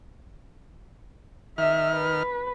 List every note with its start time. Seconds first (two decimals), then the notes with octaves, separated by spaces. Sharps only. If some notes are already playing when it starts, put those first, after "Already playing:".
1.58 D#3 E5 F6
1.95 B4